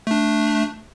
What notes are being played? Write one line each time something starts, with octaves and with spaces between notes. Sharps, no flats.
A3 D4